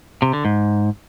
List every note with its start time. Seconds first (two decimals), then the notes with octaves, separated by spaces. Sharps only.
0.22 C3
0.33 D3
0.45 G#2